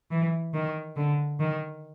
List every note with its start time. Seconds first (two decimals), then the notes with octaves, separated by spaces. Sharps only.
0.10 E3
0.53 D#3
0.95 D3
1.39 D#3